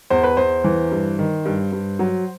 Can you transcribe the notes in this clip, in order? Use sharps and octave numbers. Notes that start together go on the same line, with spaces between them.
E2 C5
B4
E2 C5
E3
G2
D#3
G2
G2
F#3